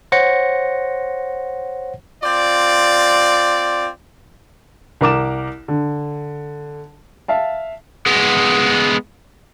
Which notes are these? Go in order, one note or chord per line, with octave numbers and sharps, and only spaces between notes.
C5 C#5 F#5 A#6 C#7
C4 F4 D5
C2 A#4 D6 E7
D3
E5 F5 A5
G#3 B3